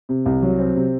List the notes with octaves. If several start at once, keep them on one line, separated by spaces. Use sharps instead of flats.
C3
C2
F#3
C4
C3